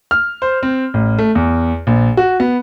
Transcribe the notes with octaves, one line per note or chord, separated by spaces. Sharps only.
F6
C5
C4
A1
A3
E2
A#1
F#4
B3